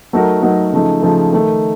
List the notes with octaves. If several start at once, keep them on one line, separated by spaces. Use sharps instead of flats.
F#3 A3 D#4 F#4 A#4
F#3 A3 D#4 F#4 A#4
C#3 F3 A3 D#4
C#3 F3 A3 D#4
D#3 A3 D#4